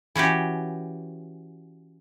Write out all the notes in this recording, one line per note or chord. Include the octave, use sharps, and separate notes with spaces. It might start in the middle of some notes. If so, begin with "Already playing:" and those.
E3 C#4 F#4 G4